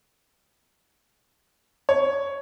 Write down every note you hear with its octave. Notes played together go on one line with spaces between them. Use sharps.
C#5